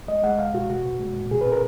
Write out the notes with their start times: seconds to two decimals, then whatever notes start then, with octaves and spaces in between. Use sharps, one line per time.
0.08 G#3 D#5
0.23 G#3 F#5
0.39 C#2 F5
0.54 B2 F#4
0.69 B2 F#4
0.85 B2
1.00 G#3
1.16 A#2
1.31 B2 G#4
1.41 B4
1.47 C#4
1.52 A#4